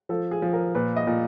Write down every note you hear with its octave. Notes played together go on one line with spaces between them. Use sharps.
F3 A4
G#4
F3
A#4
A#2 B4
D#5
A#2